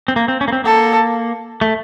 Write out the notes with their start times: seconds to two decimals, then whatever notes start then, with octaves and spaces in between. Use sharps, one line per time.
0.08 C4
0.16 A#3
0.28 C4
0.41 C#4
0.48 A#3
0.53 C4
0.64 A#3 A4
1.61 A3